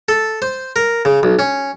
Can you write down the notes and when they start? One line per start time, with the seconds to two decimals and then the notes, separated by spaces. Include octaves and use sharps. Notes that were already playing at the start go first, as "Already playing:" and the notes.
0.09 A4
0.42 C5
0.76 A#4
1.05 C#3
1.23 B1
1.39 C#4